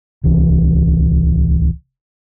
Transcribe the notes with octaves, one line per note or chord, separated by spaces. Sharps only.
D1 C2 E3